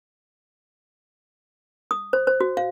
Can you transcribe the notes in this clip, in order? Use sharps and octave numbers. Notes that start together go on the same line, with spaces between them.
D#6
C5
C5
F#4
F5